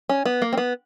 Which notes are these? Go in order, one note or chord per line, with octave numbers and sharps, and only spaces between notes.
C#4
B3
A#3
C4
B3